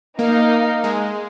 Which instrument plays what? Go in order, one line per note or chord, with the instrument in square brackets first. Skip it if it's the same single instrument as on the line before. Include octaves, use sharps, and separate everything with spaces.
[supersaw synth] A#3 [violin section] D#4 A#4 F5
[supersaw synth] G#3